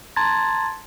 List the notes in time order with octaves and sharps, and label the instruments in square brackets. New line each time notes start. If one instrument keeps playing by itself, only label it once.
[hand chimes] A5 A#5 C6 G#6 A6